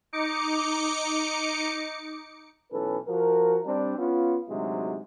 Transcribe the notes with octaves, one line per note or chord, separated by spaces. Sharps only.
D#4 D6 C#7
B1 E3 C#4 A4 B4
F3 F#4 A#4
G3 C4 D4
B3 C#4 F4
D2 G#2 C3 F#3 G#3